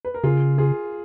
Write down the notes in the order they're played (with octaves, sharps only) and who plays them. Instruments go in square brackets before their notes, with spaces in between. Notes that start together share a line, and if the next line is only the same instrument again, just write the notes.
[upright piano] B4
A#4
[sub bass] C#3 [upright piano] F4 G#4
[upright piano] F4 G#4